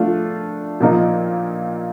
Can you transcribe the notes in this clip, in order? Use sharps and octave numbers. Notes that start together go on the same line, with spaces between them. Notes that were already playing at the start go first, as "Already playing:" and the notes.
Already playing: F3 A3 D4 F4
A#2 F3 A#3 D#4